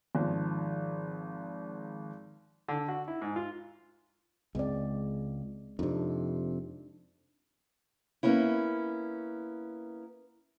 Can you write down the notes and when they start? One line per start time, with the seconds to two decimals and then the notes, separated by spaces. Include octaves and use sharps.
0.15 G#1 F3
2.68 D3
2.88 F#4
3.08 E4
3.22 G#2
3.36 F4
4.55 C#2 G#3 C4 D5
5.79 F2 C3 D4 D#4
8.23 A#3 B3 C#4 E4